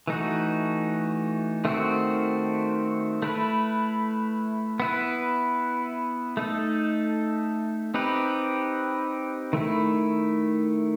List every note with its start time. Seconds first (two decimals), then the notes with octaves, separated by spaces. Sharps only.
0.08 E3 A3 D#4 F#4
1.65 D#3 A3 C4 F#4
3.22 A3 E4 B4
4.80 B3 E4 B4
6.37 A3 D#4 A4
7.94 C4 D#4 G4 B4
9.53 D#3 A3 E4